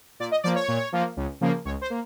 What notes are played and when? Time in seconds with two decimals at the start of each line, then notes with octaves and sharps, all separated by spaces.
0.20 A#2 D5
0.31 D#5
0.43 F3 A#3 D5
0.55 C#5
0.68 A#2
0.92 F3 A#3
1.17 C#2
1.41 C#3 F3 A#3
1.65 C#2 C#5
1.81 C5
1.90 A#3